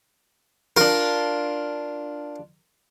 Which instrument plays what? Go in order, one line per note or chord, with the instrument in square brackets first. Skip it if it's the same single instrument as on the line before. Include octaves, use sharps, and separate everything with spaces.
[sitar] D4 F4 [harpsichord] A#4